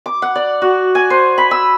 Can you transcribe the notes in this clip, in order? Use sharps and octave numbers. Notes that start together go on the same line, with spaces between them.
D6
F#5
D5
F#4
G#5
C5
B5
E6